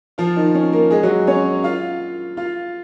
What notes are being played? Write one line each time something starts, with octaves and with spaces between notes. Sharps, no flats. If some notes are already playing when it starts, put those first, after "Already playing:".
F3 F4
D#3 D#4
C#4
A#3 A#4
G#3 G#4
F#3 F#4
C#4 C#5
F4 F5
F4 F5